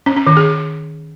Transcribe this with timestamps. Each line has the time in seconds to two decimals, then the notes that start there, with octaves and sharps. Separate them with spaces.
0.06 C#4
0.16 C#4
0.27 D#3
0.37 G#4